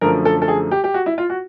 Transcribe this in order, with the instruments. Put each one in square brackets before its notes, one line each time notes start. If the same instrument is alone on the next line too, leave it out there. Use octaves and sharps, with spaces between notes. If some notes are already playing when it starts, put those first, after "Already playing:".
[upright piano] F#2 D3 F3 A3 A#4
A4
A4
G#4
G4
G4
F#4
E4
F4
F#4